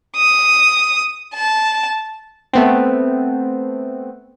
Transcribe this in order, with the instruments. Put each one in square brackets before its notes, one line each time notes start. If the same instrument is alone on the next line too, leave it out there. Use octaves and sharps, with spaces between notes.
[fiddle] D#6
A5
[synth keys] A3 B3 C4